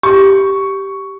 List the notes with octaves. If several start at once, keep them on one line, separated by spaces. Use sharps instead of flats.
G4 C#6